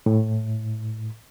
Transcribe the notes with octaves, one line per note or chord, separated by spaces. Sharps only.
A2